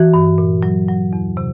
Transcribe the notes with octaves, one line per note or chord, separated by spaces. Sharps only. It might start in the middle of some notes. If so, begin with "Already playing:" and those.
Already playing: E3 F#4
G2
A#2
F#3
F#3
E2
C3